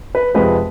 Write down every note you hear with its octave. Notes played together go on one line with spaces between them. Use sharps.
B4
F2 C3 F3 G#3 B4